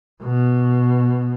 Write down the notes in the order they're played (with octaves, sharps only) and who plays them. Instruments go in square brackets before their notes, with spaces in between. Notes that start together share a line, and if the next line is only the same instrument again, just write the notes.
[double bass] B2